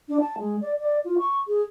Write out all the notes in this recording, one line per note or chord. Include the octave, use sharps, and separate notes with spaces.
D4
A5
G#3
D5
D5
F4
C#6
G#4